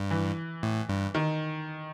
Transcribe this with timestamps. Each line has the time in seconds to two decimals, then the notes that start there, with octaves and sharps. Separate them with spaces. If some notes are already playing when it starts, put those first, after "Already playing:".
Already playing: G2
0.11 E3
0.63 A2
0.89 G2
1.15 D#3